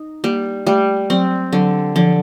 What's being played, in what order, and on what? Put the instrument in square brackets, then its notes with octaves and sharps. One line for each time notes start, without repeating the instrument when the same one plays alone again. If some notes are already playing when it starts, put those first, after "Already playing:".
Already playing: [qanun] D#4
[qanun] G3 [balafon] A#3
[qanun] G3 [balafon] A3
[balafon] F#3 [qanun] C4
[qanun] D3 [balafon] F#3
[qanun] D3 [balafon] F3